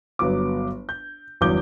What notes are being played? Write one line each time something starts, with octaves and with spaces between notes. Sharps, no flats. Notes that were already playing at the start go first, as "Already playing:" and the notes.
G1 F#3 B3 D6
G6
G1 E2 F#3 D6 G6 G7